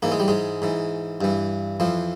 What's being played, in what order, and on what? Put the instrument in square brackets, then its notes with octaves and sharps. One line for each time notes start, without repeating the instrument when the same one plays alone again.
[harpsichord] G#2 E3 A#3
G#3
G3
G#2 G#3
G#2 E3
G2 E3
F2 E3 F3